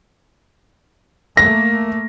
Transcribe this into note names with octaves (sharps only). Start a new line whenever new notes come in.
A3 A#3 A#6